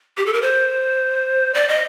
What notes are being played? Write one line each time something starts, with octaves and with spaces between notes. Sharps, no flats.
G4
A4
A#4
C5
D5
D#5